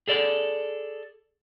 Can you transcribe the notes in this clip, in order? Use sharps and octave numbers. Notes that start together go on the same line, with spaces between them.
G#4 A4 D5